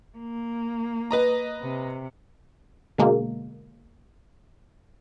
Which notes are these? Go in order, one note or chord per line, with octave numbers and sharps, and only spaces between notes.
A#3
B4 D#5 A#5
C3
B2 D3 G#3 A#3